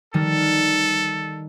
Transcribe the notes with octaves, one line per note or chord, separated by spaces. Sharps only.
D#3 G3 A4